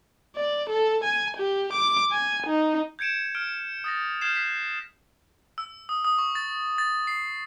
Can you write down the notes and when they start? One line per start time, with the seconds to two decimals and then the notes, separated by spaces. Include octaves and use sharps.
0.36 D5
0.70 A4
1.04 G#5
1.37 G4
1.73 D6
2.12 G#5
2.47 D#4
2.99 G6 G#6 C#7 D7 E7
3.35 F6 D7
3.84 D#6 A6 A#6
4.21 F6 G6 G#6 C7 E7
4.35 F#6 B6 C7
5.58 E6
5.89 D#6
6.05 D#6
6.18 C#6
6.35 A6
6.78 A6
7.07 C7